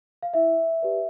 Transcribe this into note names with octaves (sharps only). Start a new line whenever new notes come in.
F5
E4 E5
G4 B4 D5